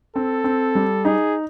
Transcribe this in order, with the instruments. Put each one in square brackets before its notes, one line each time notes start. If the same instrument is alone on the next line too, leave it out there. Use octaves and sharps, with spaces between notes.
[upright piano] C4 [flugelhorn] A4
[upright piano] C4
G3
[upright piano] D#4 [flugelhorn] G#4